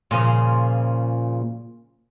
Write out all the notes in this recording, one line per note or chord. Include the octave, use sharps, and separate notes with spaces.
A#2 C#3 F3